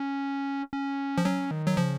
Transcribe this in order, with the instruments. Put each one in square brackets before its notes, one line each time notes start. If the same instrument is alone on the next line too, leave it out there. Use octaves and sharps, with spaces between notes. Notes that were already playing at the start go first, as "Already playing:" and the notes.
Already playing: [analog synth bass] C#4
C#4
[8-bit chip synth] F3
[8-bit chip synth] F#3 [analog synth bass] C#4
[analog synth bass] D#3
[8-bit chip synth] F#3
[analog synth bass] C#3 [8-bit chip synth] F3